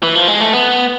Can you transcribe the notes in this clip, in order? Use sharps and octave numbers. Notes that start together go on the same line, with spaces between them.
E3
F3
G#3
A3
B3